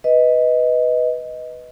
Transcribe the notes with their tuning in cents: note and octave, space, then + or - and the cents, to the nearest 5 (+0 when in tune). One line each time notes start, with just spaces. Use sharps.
B4 +0 D#5 +10